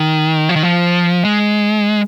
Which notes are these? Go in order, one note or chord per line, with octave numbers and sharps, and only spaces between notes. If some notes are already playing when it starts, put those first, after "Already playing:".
Already playing: D#3
F3
D#3
F3
G#3